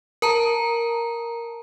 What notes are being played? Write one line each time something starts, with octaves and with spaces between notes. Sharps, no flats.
A#4 A5 A#5